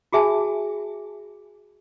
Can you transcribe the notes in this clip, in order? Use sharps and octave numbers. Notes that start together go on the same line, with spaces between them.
F#4 G#4 E5 G#5 A5